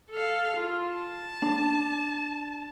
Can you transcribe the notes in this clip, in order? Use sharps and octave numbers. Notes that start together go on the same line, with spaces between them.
A4 F5
F4
A5
D4